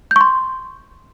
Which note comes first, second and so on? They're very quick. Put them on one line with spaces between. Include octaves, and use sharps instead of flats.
G6 C#6 C6